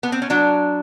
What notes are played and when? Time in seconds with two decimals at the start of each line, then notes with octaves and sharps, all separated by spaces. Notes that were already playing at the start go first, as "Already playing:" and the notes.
0.03 B3
0.12 C4
0.22 C#4
0.30 F#3 D4